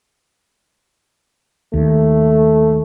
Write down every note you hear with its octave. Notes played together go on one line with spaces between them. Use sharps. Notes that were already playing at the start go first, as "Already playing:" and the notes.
D#2 A3